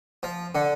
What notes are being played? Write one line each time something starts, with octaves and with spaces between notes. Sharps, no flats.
F3
D3